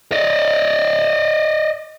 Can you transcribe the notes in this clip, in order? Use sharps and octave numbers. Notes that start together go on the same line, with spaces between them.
D5 D#5